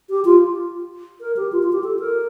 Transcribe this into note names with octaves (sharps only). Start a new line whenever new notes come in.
G4
F4
A#4
G4
F4
F4
G4
A4
A#4